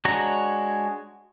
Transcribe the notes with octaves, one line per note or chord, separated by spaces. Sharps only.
G#3 D4 F#4 C#5 A#5